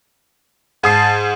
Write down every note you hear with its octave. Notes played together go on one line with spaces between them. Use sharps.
G#2 A5 D#6 C7